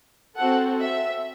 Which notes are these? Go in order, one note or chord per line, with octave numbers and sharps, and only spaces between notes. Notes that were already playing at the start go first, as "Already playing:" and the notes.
C4 F#4 A4 F#5
E5